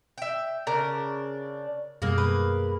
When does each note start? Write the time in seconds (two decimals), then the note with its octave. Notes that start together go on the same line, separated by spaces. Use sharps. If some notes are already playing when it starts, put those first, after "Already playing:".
0.18 E5 G5
0.67 C#3 D4 A#4
2.02 F#2 B2 G3 A#3 G#4
2.18 B4